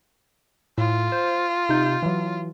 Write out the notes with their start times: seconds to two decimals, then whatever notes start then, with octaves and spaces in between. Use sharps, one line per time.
0.78 A2 F4
1.12 C5
1.69 C3 D#4 G6
2.03 E3 F#3